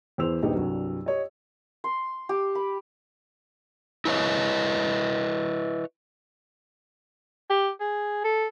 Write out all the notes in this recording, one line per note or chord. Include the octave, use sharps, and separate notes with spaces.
E2 E3 C5 E6 F7
D#1 A#1 D#4 G4 B4
C2 G2 F#3
G4 C#5 D#5
C6
G4
B5
E4 B4 C#5 D#5
G4
G#4
A4